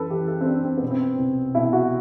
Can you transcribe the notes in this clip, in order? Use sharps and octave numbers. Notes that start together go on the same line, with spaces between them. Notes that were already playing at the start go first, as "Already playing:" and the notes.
Already playing: F#2 E3 A4 B4
E3 G4
A4
C4
F#2 D4
C4
B2 B3
C4
C2
B2 E4
F#4